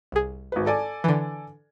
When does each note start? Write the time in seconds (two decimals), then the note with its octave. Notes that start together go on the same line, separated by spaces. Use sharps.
0.12 C2 G#4
0.52 G#1 B4
0.66 A4 D5 G#5
1.04 D3 E3